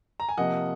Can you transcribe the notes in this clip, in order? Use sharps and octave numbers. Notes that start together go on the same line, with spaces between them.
A#5
G#5
C3 F3 A#3 D#5 F#5